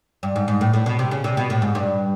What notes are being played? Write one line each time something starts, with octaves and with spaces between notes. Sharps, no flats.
G2
G#2
G#2
A2
A2
B2
C3
C#3
C3
B2
A2
G#2
G2